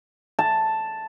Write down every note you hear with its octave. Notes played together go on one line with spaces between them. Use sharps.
A5